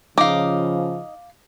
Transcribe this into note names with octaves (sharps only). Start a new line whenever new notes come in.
C#3 F3 D#4 F5 D6